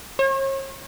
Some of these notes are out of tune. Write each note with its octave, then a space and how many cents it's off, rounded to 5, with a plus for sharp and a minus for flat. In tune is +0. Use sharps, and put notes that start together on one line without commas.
C#5 -45